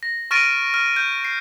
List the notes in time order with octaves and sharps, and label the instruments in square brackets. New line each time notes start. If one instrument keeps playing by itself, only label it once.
[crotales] A#6
C#6 F6 A6 A#6 D7 D#7
F6
G6
C7